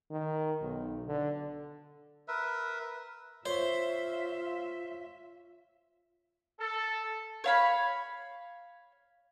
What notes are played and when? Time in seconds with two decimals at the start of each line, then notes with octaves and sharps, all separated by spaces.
0.11 D#3
0.61 B1
1.07 D3
2.28 A#4 B4 E5
3.46 F4 C5 C#5 E5
6.59 A4
7.44 C#5 F5 B5